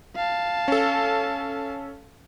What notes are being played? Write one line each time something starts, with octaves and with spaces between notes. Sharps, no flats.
F5 A5
C#4 A4